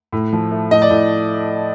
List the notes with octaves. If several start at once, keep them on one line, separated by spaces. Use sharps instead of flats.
A2
F3
A3
A2 D#5
D5
A2